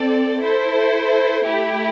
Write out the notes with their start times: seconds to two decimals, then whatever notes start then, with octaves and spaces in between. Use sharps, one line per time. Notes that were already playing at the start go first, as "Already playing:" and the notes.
Already playing: C4 A4 D5
0.41 E4 A4 C5
1.44 A3 E4 G4